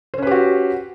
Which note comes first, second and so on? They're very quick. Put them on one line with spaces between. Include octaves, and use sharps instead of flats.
C5 C#4 B4 G4 F#4